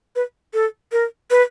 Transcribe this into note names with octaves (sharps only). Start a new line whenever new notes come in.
B4
A4
A#4
B4